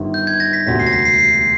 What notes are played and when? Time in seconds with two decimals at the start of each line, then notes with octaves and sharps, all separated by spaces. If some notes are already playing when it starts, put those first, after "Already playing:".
Already playing: G1 G2 D#3
0.14 G6
0.27 G#6
0.40 A#6
0.53 B6
0.66 E1 D2 C3 B6
0.80 C7
0.87 A#6
0.93 B6
1.05 C7
1.18 C7
1.33 C7